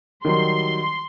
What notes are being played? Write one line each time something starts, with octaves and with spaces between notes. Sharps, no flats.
D#3 F#3 G3 C6